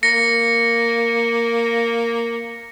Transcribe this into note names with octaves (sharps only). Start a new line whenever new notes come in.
A#3 A#6 C#7